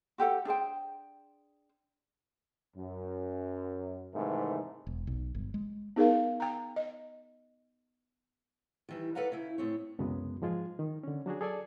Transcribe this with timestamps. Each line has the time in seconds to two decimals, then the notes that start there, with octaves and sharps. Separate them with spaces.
0.18 F#4 G4 A4 F#5
0.45 D4 G#4 C5 G5
2.76 F#2
4.13 G#2 C3 D#3 E3 A3
4.87 E1
5.07 B1
5.35 G1
5.54 G#3
5.96 B3 D#4 G#4 A#4 F5
6.40 G5 A#5
6.76 D#5
8.89 D#3 E3 G3
9.15 A4 B4 D5 F5 F#5 A#5
9.32 C#3 E4
9.58 A2 C4 C#5
9.99 C2 F#2 C#3 F#3 G#3 B3
10.42 G#2 F3 G#3 F4 G#4
10.79 D#3
11.03 D3 C#4
11.26 F#3 D4 F#4 G#4
11.41 G#4 A4 D5 G#5